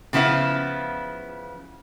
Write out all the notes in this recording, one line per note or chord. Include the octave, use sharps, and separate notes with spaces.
C#3 F3 B3 E4 F4